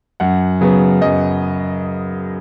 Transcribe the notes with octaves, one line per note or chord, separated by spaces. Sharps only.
F#2 F#5
C#3 F#3 B3
F#2 D#5